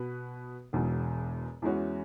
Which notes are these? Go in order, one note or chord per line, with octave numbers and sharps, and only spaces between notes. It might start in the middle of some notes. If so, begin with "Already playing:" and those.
Already playing: B2 B3 F#4 B4
E1 E2 B2 G#3
E2 E3 G#3 C#4 F#4